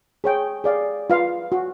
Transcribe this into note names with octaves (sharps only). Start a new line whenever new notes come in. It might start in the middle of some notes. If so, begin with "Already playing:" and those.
G#4 C#5 G5
G#4 D5 F5
F4 B4 F5
F#4